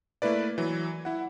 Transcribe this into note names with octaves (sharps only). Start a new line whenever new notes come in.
A3 A#3 E4 B4 D5
E3 F#3
E4 F#5